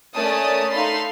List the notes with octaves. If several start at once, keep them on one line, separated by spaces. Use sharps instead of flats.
A3 C#4 A#4 D5 A5 D#6
D#4 A4 F5 B5 C6